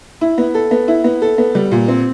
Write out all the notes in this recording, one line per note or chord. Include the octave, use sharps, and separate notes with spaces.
E4
B3
A4
B3
E4
B3
A4
B3
G3
A#2
C4